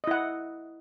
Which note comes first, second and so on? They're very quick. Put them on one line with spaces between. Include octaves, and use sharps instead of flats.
D#5 E4 F#5